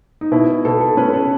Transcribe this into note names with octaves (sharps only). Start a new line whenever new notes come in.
D#4
B2 E4
B2 A4
A4
C#4 B4
A4